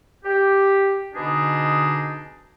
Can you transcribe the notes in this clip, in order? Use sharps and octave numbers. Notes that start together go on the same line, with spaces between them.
G4
B2 D3 D4 D#4 G#4